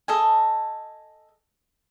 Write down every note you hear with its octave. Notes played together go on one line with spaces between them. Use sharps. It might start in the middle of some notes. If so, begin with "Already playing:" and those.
A4 D#5 G#5